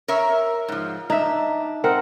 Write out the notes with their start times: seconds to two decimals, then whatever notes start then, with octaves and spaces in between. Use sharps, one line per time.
0.08 A#4 C#5 E5
0.68 G#2 F3
1.10 D4 D#4 E5
1.84 C4 A#4 F#5